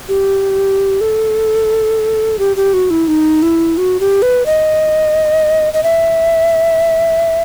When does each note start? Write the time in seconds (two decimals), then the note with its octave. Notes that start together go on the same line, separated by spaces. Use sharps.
0.09 G4
1.01 A4
2.39 G4
2.56 G4
2.74 F#4
2.90 E4
3.08 D#4
3.42 E4
3.77 F#4
4.00 G4
4.22 B4
4.46 D#5
5.73 D#5
5.83 E5